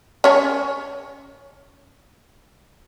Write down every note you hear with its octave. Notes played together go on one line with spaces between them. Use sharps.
C#4 C#5